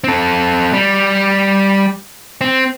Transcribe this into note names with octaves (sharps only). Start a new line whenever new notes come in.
C4 A4
G3
C4